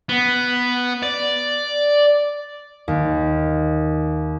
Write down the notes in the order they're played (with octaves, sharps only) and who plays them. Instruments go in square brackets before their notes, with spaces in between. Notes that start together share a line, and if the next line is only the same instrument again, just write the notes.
[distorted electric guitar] B3
D5
[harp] D#2